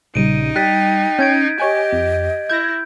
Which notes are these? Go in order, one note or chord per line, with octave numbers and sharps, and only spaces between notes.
A#1 C#3 G3 D#4 D7 D#7
G3 G5 F#6 A6 B6
C#4 G6 G#6 D7
G4 C#5 D#5 G#5
F2
E4 G6 G#6 A#6